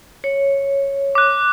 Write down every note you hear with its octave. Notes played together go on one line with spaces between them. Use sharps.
C#5
D6 F#6